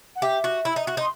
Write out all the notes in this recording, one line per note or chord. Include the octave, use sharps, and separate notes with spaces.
F#5
G4 E5
F#4
E4
D#4
F#4
D#4 C6